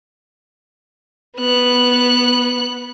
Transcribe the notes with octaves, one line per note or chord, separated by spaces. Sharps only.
B3 F#6